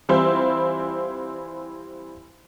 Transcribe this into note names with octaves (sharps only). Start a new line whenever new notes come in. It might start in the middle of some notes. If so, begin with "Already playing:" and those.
E3 G3 C4 E4 F4